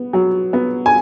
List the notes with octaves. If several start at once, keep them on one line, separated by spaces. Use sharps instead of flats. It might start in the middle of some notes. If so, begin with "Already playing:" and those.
Already playing: B3
F#3
B3
G#5